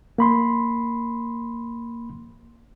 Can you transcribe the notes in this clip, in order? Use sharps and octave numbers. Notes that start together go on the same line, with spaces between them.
A#3 B5 C6